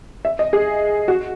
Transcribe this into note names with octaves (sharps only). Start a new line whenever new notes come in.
E5
D#5
G#4
F#4